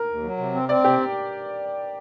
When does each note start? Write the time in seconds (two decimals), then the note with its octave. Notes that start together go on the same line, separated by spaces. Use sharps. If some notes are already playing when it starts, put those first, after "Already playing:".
Already playing: A#4
0.08 D#2
0.23 F#3
0.38 C3
0.54 C4
0.69 C4 D5
0.84 C3 G4